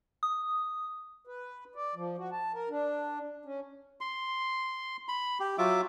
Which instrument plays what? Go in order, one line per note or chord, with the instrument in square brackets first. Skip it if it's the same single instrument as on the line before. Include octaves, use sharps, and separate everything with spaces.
[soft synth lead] D#6
[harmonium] B4
D5
F3
F#4
A5
A#4
D4
C#4
[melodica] C6
B5
G4
F#3 F4 E5 D6